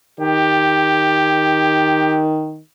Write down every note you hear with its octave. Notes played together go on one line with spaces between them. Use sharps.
D#3 G4